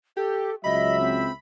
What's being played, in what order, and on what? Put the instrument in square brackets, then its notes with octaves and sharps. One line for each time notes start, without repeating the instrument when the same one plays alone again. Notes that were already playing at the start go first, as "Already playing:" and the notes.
[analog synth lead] G4 [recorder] A4
[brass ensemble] C#2 F#3 E5 [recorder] D#5 [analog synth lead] B5
[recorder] C4